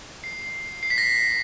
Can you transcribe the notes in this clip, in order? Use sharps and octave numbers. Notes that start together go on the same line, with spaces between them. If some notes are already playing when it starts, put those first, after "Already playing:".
C7
C7
B6
A#6